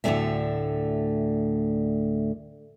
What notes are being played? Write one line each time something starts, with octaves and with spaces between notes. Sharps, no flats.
D2 A2 D3 F#3 G#3 E5